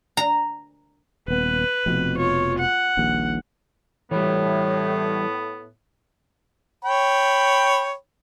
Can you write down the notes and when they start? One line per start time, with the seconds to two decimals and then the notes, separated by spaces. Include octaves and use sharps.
0.17 A#5
1.28 D#1 B3 B4
1.86 F1 F2 B2
2.16 F4 C#5
2.59 F#5
2.97 D#1 A#1 D#2
4.11 A2 E3 G3 B3
6.85 C#5 G5 B5